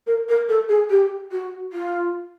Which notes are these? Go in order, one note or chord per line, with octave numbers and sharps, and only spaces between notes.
A#4
A#4
A4
G#4
G4
F#4
F4